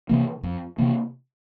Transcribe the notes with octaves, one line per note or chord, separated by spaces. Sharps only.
C3 E3 A#3
F2
C3 E3 A#3